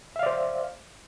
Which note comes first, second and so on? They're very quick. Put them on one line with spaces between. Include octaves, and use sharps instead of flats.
E5 F5 D5 C5